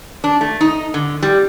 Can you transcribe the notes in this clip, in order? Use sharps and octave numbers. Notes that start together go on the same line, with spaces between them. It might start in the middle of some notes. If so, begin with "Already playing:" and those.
D4
A3
D#4
D3
G3